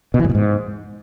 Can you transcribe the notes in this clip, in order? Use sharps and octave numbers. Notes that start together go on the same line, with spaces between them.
B2
E3
G#2
B2
G#2